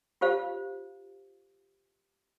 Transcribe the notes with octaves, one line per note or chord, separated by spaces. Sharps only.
F4 G4 C5 F5